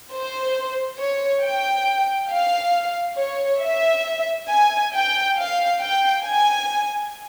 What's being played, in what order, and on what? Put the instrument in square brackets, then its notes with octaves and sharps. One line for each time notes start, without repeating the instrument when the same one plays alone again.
[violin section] C5
C#5
G5
F5
C#5
E5
G#5
G5
F5
G5
G#5